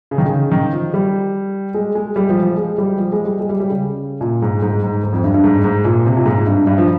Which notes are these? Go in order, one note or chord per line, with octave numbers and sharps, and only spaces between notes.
C#3
D#3
C#3
D#3
F3
G3
G#3
G#3
G3
F3
F3
G#3
G3
F3
G#3
G3
G#3
G3
G3
C#3
A#2
G#2
G#2
G#2
G#2
F2
G2
G2
G#2
G#2
A#2
C3
A#2
G#2
G2
G2
F3